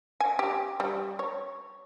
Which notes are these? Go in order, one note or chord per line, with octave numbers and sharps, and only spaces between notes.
G#5
G4
G3
C#5